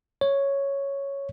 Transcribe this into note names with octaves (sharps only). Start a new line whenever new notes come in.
C#5